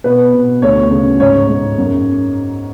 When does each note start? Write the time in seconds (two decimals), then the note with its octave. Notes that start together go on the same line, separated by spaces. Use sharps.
0.04 B2 B4
0.33 B2
0.62 D2 C#5
0.91 C#3
1.20 G#2 C#5
1.49 G#2
1.78 F#2